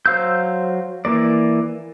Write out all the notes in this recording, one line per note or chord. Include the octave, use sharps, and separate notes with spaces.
F#3 C5 F5 E6 G6
E3 A#3 D5